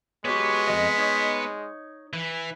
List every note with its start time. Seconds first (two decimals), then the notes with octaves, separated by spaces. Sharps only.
0.25 G#3 B3 F#4 G4 C#5
0.68 F2 G3 D#5
0.98 D#4 C#5
2.13 E3